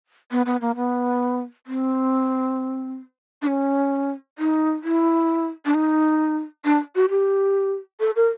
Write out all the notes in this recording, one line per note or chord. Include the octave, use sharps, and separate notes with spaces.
B3
B3
A#3
B3
C4
D4
C#4
D#4
E4
D4
D#4
D4
F#4
G4
A4
A#4